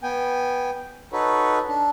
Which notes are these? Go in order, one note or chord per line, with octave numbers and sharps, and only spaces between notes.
B3 G5 G#5
D#4 F#4 A4 B4 C#5
D4